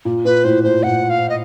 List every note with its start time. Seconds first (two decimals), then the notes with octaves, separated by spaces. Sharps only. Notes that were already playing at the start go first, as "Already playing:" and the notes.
0.05 A#2
0.25 A#2 B4
0.44 A2 C5
0.64 A#2 C5
0.83 A#2 F#5
1.10 F5
1.29 D#5